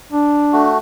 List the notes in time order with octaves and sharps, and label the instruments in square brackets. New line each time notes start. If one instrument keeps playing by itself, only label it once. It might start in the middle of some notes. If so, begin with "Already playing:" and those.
[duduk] D4
[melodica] A3 F#4